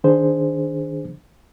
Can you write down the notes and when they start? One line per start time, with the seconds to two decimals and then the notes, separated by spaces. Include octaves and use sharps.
0.04 D#3 D4 G#4 C5